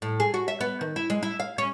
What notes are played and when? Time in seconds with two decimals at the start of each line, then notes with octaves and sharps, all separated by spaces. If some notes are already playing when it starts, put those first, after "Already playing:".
0.02 A2
0.20 G#4
0.34 F#4
0.48 E5
0.61 B3
0.81 D#3
0.96 E4
1.10 G#3
1.23 E4
1.40 F5
1.58 C#4